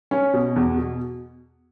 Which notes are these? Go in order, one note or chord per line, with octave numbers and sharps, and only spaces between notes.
C#4
B2
E2
B2